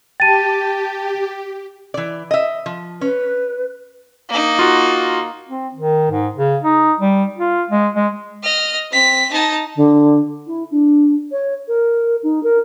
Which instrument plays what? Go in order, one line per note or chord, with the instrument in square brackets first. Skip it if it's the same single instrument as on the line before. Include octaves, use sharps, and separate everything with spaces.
[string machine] G4 [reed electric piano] G5 A5 [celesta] A6 D#7
[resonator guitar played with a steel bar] E3 D5
D#5 E5
F3
[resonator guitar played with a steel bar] C#4 [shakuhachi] B4
[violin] A#3 D#4
[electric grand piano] F4 F#4
[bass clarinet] C4
D#3
G#2
C#3
D#4
G3
F4
G#3
G#3
[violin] D#5 F6
C4 B6
D#4 A5
[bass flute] D3
E4
D4
C#5
A#4
D#4
A#4